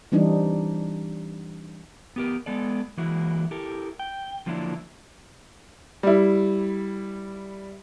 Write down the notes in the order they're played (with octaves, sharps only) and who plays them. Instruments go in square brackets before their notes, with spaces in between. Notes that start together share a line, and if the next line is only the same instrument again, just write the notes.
[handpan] E3 G3 C4 D4 D#4
[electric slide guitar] B3 G4 A#4
G#3 B3 A4 D5
E3 F#3 G#3 A#3 E4 F#4
E4 G4 A4 A#4
G5
D3 F3 F#3 A#3 D4 E4
[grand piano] G3 E4